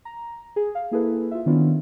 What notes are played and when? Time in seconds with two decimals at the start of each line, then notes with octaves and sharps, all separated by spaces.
0.05 A#5
0.56 G#4
0.75 F5
0.91 A#3 E4 G#4 A4 B4
1.31 F4 E5
1.46 D#3 B3 C#4 D4 E4 F4